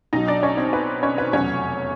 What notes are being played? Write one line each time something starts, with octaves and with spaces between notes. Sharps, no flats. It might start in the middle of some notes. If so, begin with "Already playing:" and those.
B1 B2 F#3 D#4 D#5
D4 D5
C#4 C#5
C4 C5
B4
C#4 C#5
B4
F1 E2 B2 F#3 C#4 C#5